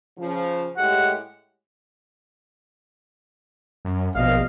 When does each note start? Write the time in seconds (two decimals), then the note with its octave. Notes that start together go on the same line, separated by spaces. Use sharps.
0.18 C#3 F3
0.77 A2 G#3 G4 F#5
3.85 F#2
4.15 A#1 B2 D#5 F5